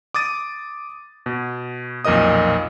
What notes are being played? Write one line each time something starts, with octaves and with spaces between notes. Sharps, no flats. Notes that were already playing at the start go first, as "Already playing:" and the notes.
D6 D#6 A6 D#7
B2
B1 F2 A#2 A#4 D#5 D#6